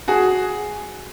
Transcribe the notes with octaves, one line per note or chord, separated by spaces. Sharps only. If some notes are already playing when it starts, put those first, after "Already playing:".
F#4 G#4